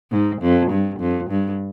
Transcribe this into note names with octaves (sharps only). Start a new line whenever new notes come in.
G#2
F2
G2
F2
G2